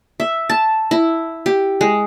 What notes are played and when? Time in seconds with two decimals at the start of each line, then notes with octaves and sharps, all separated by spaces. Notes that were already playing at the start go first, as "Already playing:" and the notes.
0.20 E5
0.50 A5
0.91 E4
1.46 G4
1.81 G#3